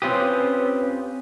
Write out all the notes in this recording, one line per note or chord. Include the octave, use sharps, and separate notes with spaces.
C4 C#4 F4 G4 B4 D#6